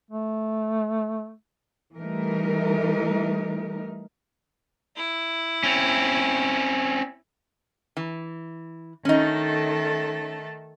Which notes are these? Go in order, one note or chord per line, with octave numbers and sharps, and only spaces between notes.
A3
E3 G3 A3 D#4 A#4
E4
C4 C#4
E3
D#3 A3 C#4 D#4 A4